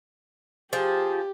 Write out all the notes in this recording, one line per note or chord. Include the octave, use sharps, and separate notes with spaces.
F3 G4 G#4